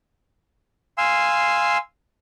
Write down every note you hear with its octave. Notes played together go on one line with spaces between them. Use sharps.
F5 G#5 C6 E6